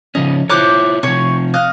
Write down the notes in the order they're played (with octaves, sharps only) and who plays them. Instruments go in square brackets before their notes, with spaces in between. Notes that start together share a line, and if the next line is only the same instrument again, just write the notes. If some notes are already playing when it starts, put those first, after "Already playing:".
[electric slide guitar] C#3 F3 C#4 [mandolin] D#5
[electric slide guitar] E4 F4 C#5 [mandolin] C5 D6 F#6
[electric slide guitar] C3 F3 [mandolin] C#5 G#5
[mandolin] D#5 F5 F#6